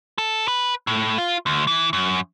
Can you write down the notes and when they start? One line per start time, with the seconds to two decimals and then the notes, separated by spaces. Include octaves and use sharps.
0.18 A4
0.48 B4
0.87 A2
1.18 F4
1.46 D2
1.67 E3
1.93 F#2